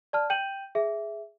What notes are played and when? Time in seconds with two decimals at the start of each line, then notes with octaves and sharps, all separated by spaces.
0.13 D5 A5 F6
0.30 G5 G6 D#7 F#7
0.75 G#4 E5